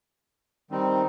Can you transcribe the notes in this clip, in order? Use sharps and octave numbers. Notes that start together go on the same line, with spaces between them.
D#3 G3 C4 D#4